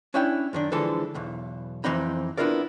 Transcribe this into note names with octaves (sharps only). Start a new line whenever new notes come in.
C#4 D4 E4 C#5 G5
F#2 D#3 D4
D3 E3 F3 G#3 A4
B1 E2 B2
F2 E3 C4 D#4 B5
B3 D4 E4 F4 A#4 D5